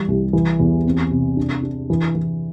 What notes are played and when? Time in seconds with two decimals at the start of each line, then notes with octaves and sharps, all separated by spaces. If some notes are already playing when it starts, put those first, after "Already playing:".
Already playing: E3 G3
0.08 C2
0.33 E3
0.60 E2
0.86 C4
1.11 C3
1.37 D4
1.63 D4
1.90 E3
2.15 E3